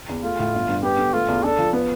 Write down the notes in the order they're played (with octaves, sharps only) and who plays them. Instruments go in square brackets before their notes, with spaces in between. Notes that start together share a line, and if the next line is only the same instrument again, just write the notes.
[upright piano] E2
[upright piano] A3 [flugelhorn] F4
[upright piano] A2
G1
G2
[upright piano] B3 [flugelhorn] G4
[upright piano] D3
[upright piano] A3 [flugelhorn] F4
[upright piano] E2
[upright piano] D4 [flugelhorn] A4
[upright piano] F3
B3